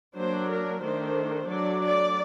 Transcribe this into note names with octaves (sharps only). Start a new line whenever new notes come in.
F#3 A#3 D4 C5
A#4
D#3 A3 D4 C5
F#3 A3 D4 D5
D5